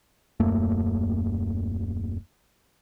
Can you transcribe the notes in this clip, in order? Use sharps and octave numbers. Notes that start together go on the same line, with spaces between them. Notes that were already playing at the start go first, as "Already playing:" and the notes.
D#1 F#2 A3 A#3